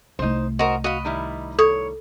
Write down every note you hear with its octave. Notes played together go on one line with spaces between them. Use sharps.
C2 A3 D#4 C5
F#4 A#4 C5 D#5
F#4 D#5 F5 B5
D#3 G3 E4
A4 C#5 D#6